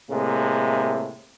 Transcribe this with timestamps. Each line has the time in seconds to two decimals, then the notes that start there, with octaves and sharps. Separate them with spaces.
0.10 A2 C3 G#3 A#3